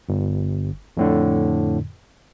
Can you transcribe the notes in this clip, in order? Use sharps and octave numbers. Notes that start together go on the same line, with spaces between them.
G1
F2 A2 D3